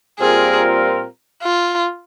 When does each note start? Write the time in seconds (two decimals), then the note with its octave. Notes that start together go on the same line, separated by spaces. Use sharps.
0.19 A#2 G3 C4 F4 G#4 A#4
1.42 F4